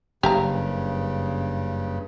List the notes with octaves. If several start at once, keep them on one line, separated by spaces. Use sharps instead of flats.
F#1 G2 C#3 G4 F5 A#5